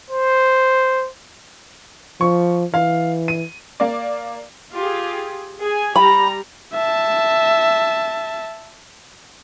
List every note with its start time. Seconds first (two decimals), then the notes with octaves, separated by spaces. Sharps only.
0.11 C5
2.21 F3 C#6
2.74 E3 F5
3.28 D#7
3.80 A#3 D5
4.73 F4 G4 G#4
5.61 G#4 G#5
5.96 G3 G4 A#5 B5
6.74 E5 A5